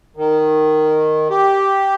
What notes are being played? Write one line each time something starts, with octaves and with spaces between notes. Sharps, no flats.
D#3
G4